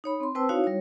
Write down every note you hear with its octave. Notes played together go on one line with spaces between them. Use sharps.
D#4 C#5 B5
C4 C6
C4 B4 C5 G5 A5 E6
D#4 E4 F#4 C#5 F5
G3 C#5